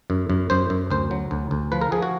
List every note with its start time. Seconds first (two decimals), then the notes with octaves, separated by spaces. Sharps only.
0.10 F#2
0.30 F#2
0.50 F#2 C5
0.70 F#2
0.90 D2 C5
1.11 F#3
1.31 D2
1.51 D2
1.72 F3 B4
1.82 A#4
1.92 F3 G#4
2.02 F#4